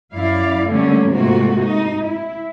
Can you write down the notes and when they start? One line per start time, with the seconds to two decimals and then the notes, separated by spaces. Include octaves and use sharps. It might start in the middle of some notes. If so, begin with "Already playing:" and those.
0.13 F#2 E4 D5 F5
0.67 D3 F#3 G3 A3 A#3 C#4
1.10 G#2 C3 A3 A#3 F4 F#4
1.57 D#4
2.05 E4